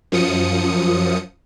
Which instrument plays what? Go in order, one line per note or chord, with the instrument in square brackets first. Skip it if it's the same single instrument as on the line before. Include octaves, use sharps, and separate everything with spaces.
[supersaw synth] F#2 F3 D#6 C#7